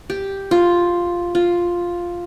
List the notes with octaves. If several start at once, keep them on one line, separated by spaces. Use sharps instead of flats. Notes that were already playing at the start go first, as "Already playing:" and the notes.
G4
F4
F4